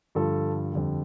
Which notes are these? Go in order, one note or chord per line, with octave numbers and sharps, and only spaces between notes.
G2 D3 F3 A4
F2 D3 G3